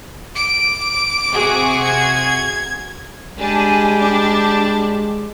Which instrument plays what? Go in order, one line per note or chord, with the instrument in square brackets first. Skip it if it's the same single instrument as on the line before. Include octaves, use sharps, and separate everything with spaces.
[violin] D6 D7
[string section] C3 F#4 G#4
[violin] G#6
[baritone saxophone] G3 [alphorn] G#3 [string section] D4 [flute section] G#5
[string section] D4 [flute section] G4